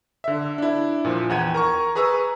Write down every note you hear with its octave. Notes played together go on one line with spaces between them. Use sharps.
D3 E5
D4 E4
A#2 F3
E2 F#5 G5 G#6 D#7
A#4 A#5 C#6
G#4 B4 A#5 C#6 E6